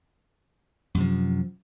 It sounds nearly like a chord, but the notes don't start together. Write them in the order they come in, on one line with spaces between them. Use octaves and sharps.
F#2 C3 F3